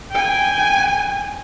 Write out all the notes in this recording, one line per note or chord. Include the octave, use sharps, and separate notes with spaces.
G5 G#5